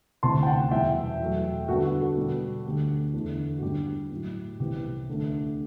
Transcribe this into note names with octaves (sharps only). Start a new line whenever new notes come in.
D2 C3 E3 A5 C6
G5
F#5 A5
E2 B2 G3 B3 E5 G5
E2 B2 F#3 A3
G2 D3 G3 B3 F#4 A4
F#4
F#4 A4
B2 G3 B3
D2 D3 A3 G4
E2 D3 A3
F#4
G2 D3 G3 G4
A2 F#3 A3
C2 C3 E3 B3 G4
D2 D3 A3